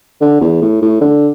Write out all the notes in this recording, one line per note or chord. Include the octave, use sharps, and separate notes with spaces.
D3
E2
A2
A2
D3